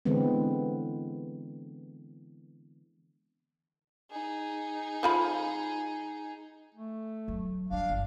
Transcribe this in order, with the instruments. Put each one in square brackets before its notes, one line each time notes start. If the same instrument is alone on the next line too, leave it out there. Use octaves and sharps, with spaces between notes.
[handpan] D3 E3 G#3 B3 C4
[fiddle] D#4 G#4
[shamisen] F3 F4 B5
[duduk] A3
[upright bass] F#3
[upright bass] D3 G3 [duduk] D4 [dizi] F5
[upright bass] G1